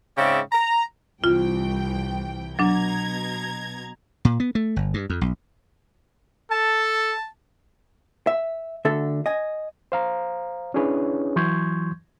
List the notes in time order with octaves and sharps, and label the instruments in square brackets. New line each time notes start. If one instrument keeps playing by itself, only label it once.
[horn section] G#2 C#3 C4 D5 E5 G5
A#5
[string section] C2 E3 G5 [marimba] F4
[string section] B2 A#5 G#6 [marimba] F#3 D4
[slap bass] A#2
B3
A3
G1
G2
F2
B1
[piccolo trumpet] A4 [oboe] A5
[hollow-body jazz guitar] E5
D2 D3 A4 E5
D#5 G#5
[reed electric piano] C5 F5 A#5
C#4 D4 E4 G#4 B4 C#5
E3 F#3 C6 C#6 G6 G#6